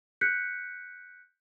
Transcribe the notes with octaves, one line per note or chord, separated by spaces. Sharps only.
F#6 G6 B6 C#7